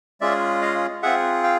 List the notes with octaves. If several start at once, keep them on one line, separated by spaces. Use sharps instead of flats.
G#3 C#4 F4 G#4 D5 E5
D#5 F5
C4 F4 G#4 E5 F#5
F5 G5